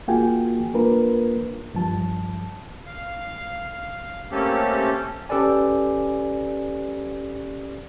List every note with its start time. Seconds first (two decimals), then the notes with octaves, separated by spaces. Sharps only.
0.08 A#3 F4 F#4 G#4 G5 G#5
0.74 A#3 D4 F4 A#4 B4
1.74 G2 F3 A5
2.86 F5
4.32 A3 A#3 C4 C#4 G4 A4
5.29 C#4 G4 A4 B4 D5 G#5